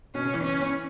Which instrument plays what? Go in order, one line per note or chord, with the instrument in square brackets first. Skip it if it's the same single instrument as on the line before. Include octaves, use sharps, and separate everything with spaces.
[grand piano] B2 [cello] C#4
[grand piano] C#3
E3
[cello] C#4